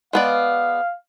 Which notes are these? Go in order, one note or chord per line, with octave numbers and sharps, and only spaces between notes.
G#3 B3 D5 F5